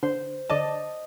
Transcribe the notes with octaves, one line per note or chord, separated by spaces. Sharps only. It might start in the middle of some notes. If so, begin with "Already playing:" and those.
D3 C5
D3 D5 D#5 A5